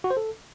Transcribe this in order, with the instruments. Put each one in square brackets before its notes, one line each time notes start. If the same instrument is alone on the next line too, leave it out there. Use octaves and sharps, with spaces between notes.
[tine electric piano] F#4
C5
A4